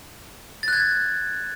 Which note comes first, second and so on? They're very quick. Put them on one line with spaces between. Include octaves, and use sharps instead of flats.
A6 F#6 G#6